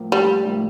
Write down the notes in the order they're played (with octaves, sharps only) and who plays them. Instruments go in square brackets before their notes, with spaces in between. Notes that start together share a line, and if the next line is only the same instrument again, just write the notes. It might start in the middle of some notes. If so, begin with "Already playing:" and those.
Already playing: [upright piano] A2 F3 A#3
[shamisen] G3
[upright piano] A2 F3 A#3